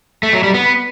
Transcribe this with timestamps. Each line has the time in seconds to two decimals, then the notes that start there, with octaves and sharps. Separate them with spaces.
0.23 A3
0.33 F#3
0.44 G3
0.54 B3